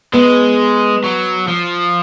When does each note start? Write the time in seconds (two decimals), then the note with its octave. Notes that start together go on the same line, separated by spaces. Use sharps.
0.13 G#3 B3
1.04 F#3
1.48 F3